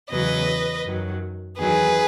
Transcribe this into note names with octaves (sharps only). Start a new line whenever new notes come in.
E2 C#3 F#3 B4 D#5
F#2 D#3 F#3
E2 D#3 F#3 G#4 B4